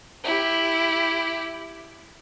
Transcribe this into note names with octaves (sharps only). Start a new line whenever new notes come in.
E4 G4